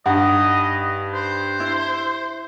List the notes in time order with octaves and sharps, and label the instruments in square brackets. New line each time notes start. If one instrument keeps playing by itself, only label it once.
[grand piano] G2 [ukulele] D#4 F#5 [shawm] D#5
[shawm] C5
[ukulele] E4